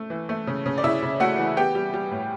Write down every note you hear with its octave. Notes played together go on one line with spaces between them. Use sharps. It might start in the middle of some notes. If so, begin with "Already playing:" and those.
Already playing: A3
E3
A3
C#3
C#3
D5
C#3 E4 E5
C#3
A3 F#4 F#5
E3
B3 G4 G5
G3
G3
A2